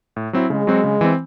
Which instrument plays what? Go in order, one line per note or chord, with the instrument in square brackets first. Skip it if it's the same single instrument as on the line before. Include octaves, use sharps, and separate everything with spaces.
[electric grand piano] A2
F#3 C4 E4
[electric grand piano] C#3 [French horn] G#3
[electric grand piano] F#3 C4 F#4
C#3
E3 C4